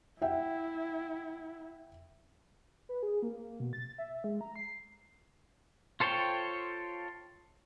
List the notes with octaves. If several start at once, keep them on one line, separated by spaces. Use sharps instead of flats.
E4 E5 F#5 G5
B4
G#4
A#3
B2
A6
E5
G#3
A#5
C7
F4 A4 C5 C#5 G5